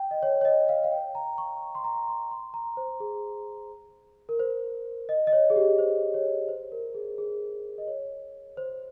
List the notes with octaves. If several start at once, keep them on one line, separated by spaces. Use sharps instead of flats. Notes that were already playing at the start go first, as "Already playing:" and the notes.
Already playing: G5
D#5
C#5
C#5
D#5
F5
F5
G5
A#5
C#6
C6
A#5
C6
C6
A#5
C5
G#4
A#4
C5
D#5
D#5
C#5
G#4
G4
C5
C#5
C5
A#4
G#4
G#4
D#5
C#5
C5